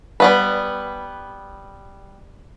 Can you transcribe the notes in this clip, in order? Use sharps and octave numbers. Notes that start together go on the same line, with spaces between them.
G3 B3 B4